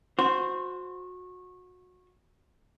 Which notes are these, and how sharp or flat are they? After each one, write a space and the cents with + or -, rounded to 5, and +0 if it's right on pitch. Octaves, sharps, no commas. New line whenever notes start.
F#4 -25 C5 +0